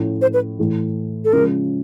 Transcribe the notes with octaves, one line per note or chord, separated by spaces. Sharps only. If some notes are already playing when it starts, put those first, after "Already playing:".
Already playing: A2 F3 A3 C#4 F4
C5
B4
A2 E3 A3
A4
C#3 F3 G#3 A#4